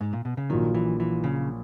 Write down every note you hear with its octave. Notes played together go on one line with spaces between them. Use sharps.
G#2
A#2
B2
C#3
A#1 A#2 D#3 F#3
E3
E3
C#3